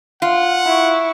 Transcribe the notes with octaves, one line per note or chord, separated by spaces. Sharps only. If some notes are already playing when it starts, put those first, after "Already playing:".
F4 F#5
E4 C#6